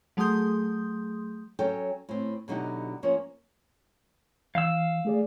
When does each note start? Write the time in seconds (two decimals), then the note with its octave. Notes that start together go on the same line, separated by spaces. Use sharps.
0.17 F#3 A3 G#4 C6 D#6 G6
1.59 F#3 C#4 A4 G5
2.09 A2 C4
2.48 B2 D3 F#3 D#4 E4 G4
3.03 F3 A#3 C#4 C#5
4.55 E3 F5 E6
5.05 A3 G#4 D5